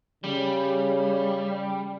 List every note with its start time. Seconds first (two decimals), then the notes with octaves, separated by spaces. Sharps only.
0.24 C#3 G3